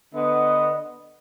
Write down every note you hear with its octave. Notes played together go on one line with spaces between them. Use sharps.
D3 B3 D#5